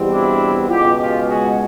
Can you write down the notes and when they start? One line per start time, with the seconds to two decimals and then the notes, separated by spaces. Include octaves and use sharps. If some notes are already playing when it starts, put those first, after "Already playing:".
Already playing: E2 B2 G3 C4
0.11 D4 E4
0.69 C#2 B2 G#3 F4 G4
0.99 F4 G4
1.28 F#4 G#4